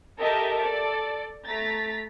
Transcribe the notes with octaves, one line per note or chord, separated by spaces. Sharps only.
G4 A4 A#4 D#5 E5 A5
A4 D5
A3 A#5 A6 B6